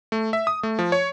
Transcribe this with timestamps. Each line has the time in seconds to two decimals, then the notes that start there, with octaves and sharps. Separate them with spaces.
0.12 A3
0.33 E5
0.47 D#6
0.63 A3
0.79 F3
0.92 C#5